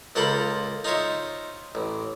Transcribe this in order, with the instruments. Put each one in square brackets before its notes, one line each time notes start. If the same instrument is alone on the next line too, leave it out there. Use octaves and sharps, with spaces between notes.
[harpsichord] C#2 A#3 F4 A4 C5 B5
D#4 F4 C5 C#5 E5
A1